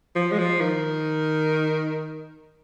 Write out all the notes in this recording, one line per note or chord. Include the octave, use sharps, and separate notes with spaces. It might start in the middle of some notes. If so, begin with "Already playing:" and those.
F3
G#3
F3
D#3